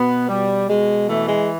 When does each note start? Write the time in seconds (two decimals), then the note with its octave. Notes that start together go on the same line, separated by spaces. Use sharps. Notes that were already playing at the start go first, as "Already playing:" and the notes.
Already playing: B2 B3
0.28 B2 G3
0.68 B2 G#3
1.08 E3 A3
1.28 G#3